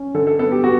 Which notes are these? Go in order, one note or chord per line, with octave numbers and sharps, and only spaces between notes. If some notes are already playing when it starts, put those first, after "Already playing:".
Already playing: C#4
D3 A4
A4
B3 A4
G4
B3 F#4